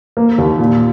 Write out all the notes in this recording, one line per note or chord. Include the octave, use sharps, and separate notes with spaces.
A#3
D#2
A#2